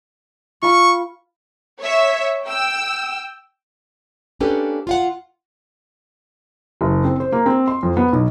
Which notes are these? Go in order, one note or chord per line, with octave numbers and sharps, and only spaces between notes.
F4 F5 B5 C#6
C#5 E5
G5 E6
A#3 C#4 D4 G4 A4 B4
F4 F5 F#5
F#1
C4
C5
A#3
C4
C6
F2
B3
B1